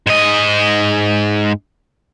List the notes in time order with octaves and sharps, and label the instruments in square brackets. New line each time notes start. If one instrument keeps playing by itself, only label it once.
[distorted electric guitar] G#2 D#5